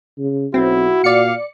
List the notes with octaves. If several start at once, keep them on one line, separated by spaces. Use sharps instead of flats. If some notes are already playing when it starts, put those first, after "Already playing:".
C#3
B1 C4 E4 F#4
A#2 D5 F5 C#7